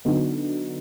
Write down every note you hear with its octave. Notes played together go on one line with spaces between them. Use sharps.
D3 F#3 B3 D#4 F#4